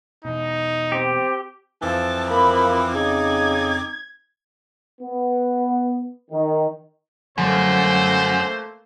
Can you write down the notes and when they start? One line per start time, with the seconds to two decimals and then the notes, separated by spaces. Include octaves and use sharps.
0.25 E2 B2 D#4
0.92 C4 G4
1.82 F2 E3 F3 C4 A5 D6
2.30 A#3 B5
2.95 C#3 D#4 G#6
5.01 B3
6.31 D#3
7.38 F#2 D3 F#3 G3 A3 A#3 C5